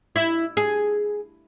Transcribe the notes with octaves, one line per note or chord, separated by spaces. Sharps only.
E4
G#4